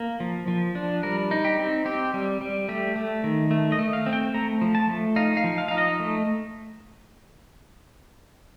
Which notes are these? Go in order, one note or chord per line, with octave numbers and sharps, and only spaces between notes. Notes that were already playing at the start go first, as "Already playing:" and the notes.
Already playing: A#3
F3
F3
D4
G3 A#4
D#4
G4
C4
C4 G4
G3
G3
A3 G4
A3
D#3
A3
D#5
A3
F5
C4
G5
A3 A#5
F3
A5
A3
D#4 F5
F5
F3
F5
D#4 F5
D#5
A3